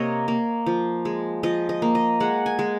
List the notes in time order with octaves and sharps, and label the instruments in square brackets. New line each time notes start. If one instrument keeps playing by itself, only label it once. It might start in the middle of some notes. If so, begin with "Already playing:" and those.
Already playing: [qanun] C3 A#3 C#5 D#5
A#3
F3
G#3
F3 D#5
D#5
A#3
D#5
G#3 F#5
G#5
G#3